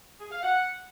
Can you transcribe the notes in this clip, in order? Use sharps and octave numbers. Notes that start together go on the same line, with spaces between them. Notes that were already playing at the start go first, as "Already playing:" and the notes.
G#4
F5
F#5